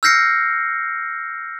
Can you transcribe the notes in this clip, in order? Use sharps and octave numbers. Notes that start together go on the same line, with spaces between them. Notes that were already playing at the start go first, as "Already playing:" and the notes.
E6 F6 G6 A#6 C7 C#7